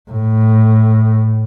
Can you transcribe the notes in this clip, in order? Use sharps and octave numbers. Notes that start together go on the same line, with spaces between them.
A2